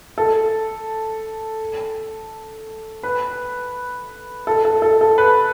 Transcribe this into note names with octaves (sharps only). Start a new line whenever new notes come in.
A4
B4
A4
A4
A4
A4
B4